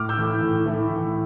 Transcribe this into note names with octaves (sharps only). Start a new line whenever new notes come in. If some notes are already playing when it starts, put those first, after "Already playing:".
Already playing: A2 D6 F6
E6 G6
E3 A3 E4
A2
E3 A3 E4
A2